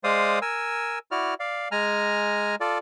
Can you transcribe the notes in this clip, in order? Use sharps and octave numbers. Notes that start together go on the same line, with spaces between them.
G#3 C5 D5 F5 D#6
A#4 G#5 E6
E4 F#4 D5 F6
D5 F5
G#3 G#5 A#5 F6
F4 A4 D5